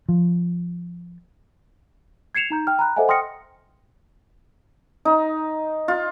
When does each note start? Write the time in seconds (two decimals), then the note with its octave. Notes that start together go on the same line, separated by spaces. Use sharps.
0.09 F3
2.35 G#6 C7 C#7 E7 F7
2.50 D#4 A#5 G6
2.67 G5 F6
2.79 A#5 B5 F#6
2.96 A4 C5 D#5 E5 F#5 G#5
3.08 G5 C6 D#6 F6 A#6 C#7
5.05 D#4
5.88 F4